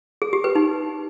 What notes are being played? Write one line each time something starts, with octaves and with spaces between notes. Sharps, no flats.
G#4
G4
B4
D#4